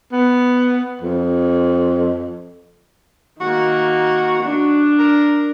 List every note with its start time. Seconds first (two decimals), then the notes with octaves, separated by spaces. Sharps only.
0.12 B3
1.01 F2
3.41 D#3 A#3 F#4
4.42 D4 F#4
4.99 A#4